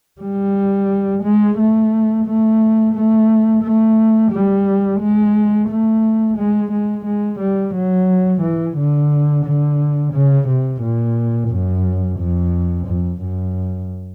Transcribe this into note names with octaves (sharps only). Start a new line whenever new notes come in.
G3
G#3
A3
A3
A3
A3
G3
G#3
A3
G#3
G#3
G#3
G3
F#3
E3
D3
D3
C#3
C3
A#2
F#2
F2
F2
F#2